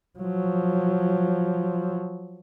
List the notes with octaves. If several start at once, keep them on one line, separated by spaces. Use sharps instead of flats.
F3 F#3